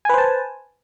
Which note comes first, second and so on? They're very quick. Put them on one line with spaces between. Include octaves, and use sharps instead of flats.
G#5 B4 C5 A5